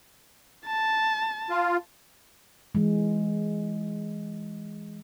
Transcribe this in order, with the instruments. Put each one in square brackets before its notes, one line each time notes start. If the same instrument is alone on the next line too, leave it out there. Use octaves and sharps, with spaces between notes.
[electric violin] A5
[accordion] F4
[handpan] E3 G#3